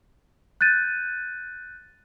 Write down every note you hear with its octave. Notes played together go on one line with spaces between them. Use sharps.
F#6 G6 A6 D#7